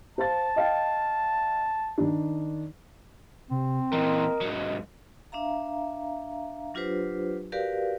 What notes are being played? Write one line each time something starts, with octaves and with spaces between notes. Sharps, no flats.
C5 F5 A5 A6
D#5 F5 G5
D#3 D4
C3 C4
A#2 E3 A#4 D#5
G#2 F#3
D4 E5 F5 A#5
F#3 D4 F4 G4 B4 C5
F#4 G4 A#4 B4 D5 F5